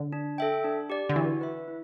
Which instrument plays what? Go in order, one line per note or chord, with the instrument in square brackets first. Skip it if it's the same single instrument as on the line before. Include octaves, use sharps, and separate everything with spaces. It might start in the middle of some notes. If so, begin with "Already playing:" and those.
Already playing: [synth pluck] D3
[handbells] D4
A4 E5 G5
D4
G4 D5
[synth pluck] D3
[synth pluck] E3 [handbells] F#4
[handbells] B4 E5
E4